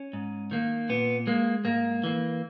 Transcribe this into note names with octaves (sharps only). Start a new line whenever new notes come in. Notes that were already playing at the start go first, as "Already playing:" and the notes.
Already playing: C#4
G#2
D#3 A#3
A#2 B3
G#3 A#3
G#2 A#3
E3 A#3